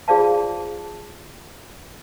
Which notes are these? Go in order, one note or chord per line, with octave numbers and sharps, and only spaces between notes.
F4 G#4 C5 D5 F5 A5